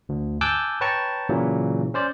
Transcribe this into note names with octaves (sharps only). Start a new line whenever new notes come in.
D2
G#5 A5 D6 E6 F#6 G6
B4 C#5 G5 A5 A#5 C#6
A#2 C#3 E3 F#3
C#4 C5 D5